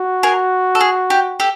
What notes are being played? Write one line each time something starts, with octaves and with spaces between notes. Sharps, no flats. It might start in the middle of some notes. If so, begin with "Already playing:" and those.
Already playing: F#4
G#4 A#4
A4
G#4
G4
G4 A4